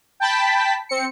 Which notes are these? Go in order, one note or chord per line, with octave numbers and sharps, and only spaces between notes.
G5 A5 B5 B6
C4 C#7